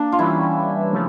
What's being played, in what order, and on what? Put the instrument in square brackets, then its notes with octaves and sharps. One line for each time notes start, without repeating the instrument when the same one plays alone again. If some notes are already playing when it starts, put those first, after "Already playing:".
Already playing: [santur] A#3 D4
F4
[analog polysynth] E3 G3 C#4 [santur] E4
[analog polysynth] C#3 F3 A3